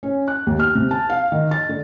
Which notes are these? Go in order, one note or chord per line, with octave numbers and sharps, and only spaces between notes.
C#4
F#6
D#2
F6
C3
A5
F5
D#3
A6
D3